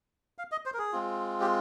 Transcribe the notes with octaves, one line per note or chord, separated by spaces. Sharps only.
F5
D#5
C5
A#4
G#4
G#3 C4 F4
G4